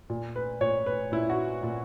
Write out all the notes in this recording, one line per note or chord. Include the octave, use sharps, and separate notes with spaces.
A#2
B4
A#2 C#5
B4
A#2 E4
F#4
A#2